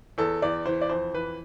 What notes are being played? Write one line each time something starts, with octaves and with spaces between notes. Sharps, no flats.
E2 A4
E2 D5
E3 C5
D5
F2 C5
E3 B4